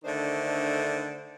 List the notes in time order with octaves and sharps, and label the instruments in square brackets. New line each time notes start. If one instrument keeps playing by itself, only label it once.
[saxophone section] D3 D#3 A3 D4 C5